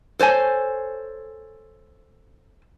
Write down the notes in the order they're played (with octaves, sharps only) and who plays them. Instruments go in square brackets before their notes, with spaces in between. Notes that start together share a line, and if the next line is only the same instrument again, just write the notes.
[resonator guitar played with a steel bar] A4 C5 C#5 G#5